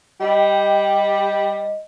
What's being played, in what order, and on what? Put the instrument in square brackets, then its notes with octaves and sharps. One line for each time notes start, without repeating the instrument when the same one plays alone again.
[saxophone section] G3 G4 [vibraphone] D#5